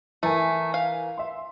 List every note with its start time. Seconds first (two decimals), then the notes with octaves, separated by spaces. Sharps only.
0.23 E3 A3 A#4 G#5
0.74 F5
1.18 E5 C6